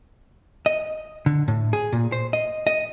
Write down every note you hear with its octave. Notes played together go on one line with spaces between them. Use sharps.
D#5
D3
A2
G#4
A#2
C5
D#5
D#5